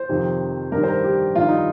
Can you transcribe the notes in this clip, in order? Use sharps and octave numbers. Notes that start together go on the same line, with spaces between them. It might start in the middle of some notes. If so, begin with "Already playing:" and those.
Already playing: C5
F2 C3 D#3
G2 D#3 A#4
C5
A#4
G4
G2 D#3 F4
D#4